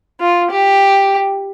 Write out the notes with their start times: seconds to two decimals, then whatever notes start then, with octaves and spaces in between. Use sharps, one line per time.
0.20 F4
0.51 G4